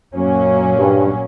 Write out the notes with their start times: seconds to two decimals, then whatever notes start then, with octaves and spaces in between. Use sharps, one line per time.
0.14 F#2 A#2 F#3 A#3 C#4
0.77 G2